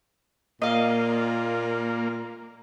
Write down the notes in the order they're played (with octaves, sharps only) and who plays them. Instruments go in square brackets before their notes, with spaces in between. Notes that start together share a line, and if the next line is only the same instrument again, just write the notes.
[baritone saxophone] A#2 [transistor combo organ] A#3 [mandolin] D#5 F5